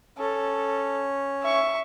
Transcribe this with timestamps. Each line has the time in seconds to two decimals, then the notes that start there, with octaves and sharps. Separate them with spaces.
0.18 C#4 A4
1.43 E5 C#6